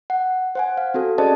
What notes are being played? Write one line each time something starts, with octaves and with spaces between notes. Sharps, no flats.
F#5
C5 F#5 G#5
F5
C4 F#4 A4
C#4 G#4 C5 D5 D#5 A5